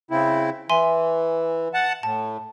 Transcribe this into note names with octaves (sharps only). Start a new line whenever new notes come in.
C#3 C4 E4
E3 E5 G#5 C6
F#5 A5
A2 A5